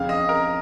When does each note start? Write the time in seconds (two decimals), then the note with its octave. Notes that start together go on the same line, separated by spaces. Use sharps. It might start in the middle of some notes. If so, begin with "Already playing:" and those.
Already playing: F2 C#3 F5
0.09 D#5
0.29 A#4